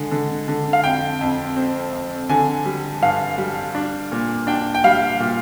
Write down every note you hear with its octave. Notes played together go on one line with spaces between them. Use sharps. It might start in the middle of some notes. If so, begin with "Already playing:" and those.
Already playing: D3 G#3
D3
D3
F5
F2 G5
F2
C4
F2
D3 G#5
G3
G2 F5
G3
D4
A#2
D4 G5
G5
G3 F5
A#2